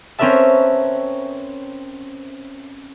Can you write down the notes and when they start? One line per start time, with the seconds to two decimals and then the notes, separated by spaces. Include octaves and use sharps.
0.19 C4 C#4 A#4 B4 E5 A5